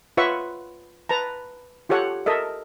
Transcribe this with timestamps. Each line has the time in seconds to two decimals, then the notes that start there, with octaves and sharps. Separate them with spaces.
0.17 F4 B4 C#5 E5 F#5 C#6
1.09 B4 A5 A#5
1.89 F4 G4 A4 C#5 F#5
2.26 A4 A#4 D#5 E5